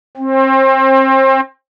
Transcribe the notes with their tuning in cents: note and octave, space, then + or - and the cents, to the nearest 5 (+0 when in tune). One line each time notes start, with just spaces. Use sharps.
C4 +30